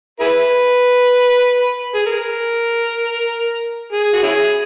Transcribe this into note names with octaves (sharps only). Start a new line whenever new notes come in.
E4 G#4 B4
G#4
A#4
G#4
F#4
C#4 E4 G#4